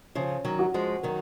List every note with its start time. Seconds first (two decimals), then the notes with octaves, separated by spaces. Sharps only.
0.15 C#3 F3 C#4
0.45 D#3 F#3
0.59 F#4
0.74 F3 G#3
1.03 D#3 F#3 A#4